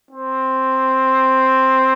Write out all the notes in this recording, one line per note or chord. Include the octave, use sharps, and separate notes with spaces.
C4